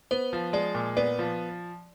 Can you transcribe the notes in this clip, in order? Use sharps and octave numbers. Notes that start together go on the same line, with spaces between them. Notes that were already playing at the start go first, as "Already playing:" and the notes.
B3 C5
F3
G#3 D5
A#2
B3 D5
F3